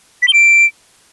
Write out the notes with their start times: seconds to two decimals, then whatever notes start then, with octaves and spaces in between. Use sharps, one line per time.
0.22 B6
0.28 G7
0.33 D7